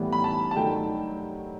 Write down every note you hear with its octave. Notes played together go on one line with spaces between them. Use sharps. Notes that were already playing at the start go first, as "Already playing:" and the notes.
Already playing: A2 E3 G3 B3
B5
A5
A5
G2 D#3 F#3 A3 G5